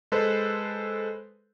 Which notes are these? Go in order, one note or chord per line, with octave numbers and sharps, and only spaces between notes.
G#3 A4 B4 C5